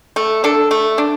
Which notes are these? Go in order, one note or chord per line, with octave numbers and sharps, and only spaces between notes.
A3
D4 A4
A3
D4